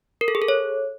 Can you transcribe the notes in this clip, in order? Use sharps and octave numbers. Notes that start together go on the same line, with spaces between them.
A#4
A4
G#4
A4
C#5